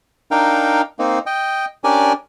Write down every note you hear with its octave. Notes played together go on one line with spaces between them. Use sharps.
D4 D#4 A#4 F5 G5
A#3 C4 D#4
D#5 G5
C#4 D4 G4 A#4 D5 G#5